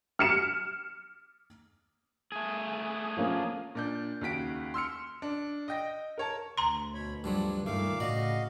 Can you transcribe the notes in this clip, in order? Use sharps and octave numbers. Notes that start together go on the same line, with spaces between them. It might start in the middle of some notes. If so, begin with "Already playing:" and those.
F6 C#7 E7
A3 G#4
F3 A#3 C#4
A#2 D4 G6
D#2 C#3 F#4 B6 D7
C6 E6 F6 C#7
D4
D#5 G5 A#6
A#4 C#5 A5
D2 A#5 C6
B2 C#5 B5
G2 F3 F#3 D4
G2 A#2 D#3 A3 F5 D6
A2 C#3 F#4 D5 D#5 F5